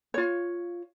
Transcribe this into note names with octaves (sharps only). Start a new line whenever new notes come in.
F4 C#5